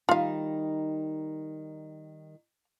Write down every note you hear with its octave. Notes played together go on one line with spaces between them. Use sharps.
D#3 G3 D#4 F4 F5